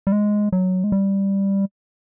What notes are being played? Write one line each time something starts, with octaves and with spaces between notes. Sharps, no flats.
G3
G#3
F#3
G#3
G3